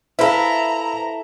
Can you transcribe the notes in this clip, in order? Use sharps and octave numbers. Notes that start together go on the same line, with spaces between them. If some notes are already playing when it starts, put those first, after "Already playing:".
E4 A4 B4 C5 E5 F5 A#5 B5